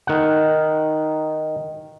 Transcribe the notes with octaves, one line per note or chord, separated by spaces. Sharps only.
D#3 F#5